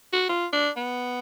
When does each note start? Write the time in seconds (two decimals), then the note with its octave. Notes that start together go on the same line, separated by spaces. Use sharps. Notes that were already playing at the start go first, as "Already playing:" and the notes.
0.13 F#4
0.29 F4
0.53 D4
0.77 B3